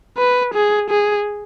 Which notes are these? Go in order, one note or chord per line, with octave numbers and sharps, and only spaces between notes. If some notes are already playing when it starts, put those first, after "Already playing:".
B4
G#4
G#4